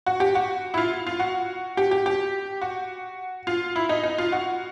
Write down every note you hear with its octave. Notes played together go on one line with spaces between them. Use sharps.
F#4
G4
F#4
E4
F4
F4
F#4
G4
G4
G4
F#4
F4
E4
D#4
D#4
F4
F#4